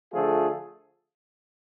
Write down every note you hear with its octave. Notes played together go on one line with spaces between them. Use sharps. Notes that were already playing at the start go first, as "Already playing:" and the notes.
D3 F3 A3 F4 G#4